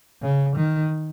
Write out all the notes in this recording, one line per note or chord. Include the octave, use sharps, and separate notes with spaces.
C#3
D#3